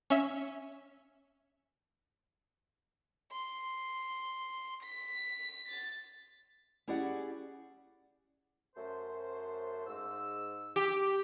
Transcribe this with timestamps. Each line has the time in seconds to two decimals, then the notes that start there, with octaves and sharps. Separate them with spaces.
0.10 C#4 E5
3.32 C6
4.83 B6
5.69 A6
6.87 C#4 E4 G4 G#4 D5 F#5
8.76 F#2 A3 C5
9.87 G#2 E6
10.76 G4